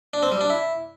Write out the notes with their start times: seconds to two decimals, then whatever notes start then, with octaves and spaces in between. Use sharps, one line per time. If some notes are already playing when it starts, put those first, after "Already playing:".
0.13 D4
0.23 C4
0.32 G3
0.41 D4
0.50 E4